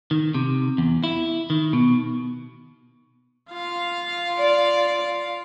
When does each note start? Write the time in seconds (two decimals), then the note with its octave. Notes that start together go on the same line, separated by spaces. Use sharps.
0.11 D#3
0.35 C3
0.78 E2
1.04 E4
1.50 D#3
1.73 B2
3.53 F4 F5
4.38 D5